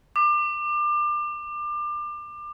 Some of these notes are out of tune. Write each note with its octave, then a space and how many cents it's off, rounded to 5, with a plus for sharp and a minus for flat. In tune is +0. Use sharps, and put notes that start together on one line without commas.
D6 +30